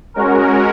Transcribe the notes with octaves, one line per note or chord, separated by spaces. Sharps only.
G#3 C#4 F#4 A#4